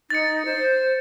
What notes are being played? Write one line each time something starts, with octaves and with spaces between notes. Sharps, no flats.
D#4 A6 C#7
C5